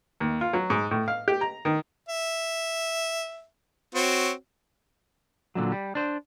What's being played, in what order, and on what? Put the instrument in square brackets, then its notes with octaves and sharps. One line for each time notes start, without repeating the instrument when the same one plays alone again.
[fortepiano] D#2
F4
F#3
G#2
A2
F5
G4
A#5
D#3
[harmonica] E5
C4 F#4 C#5
[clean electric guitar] A#2 D3 E3 F#3
G3
D4 C5